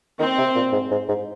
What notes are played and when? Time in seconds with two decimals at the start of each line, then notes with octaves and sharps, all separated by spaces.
0.19 D#3 C4
0.38 C3
0.55 A#2
0.72 G#2
0.91 G#2
1.08 G#2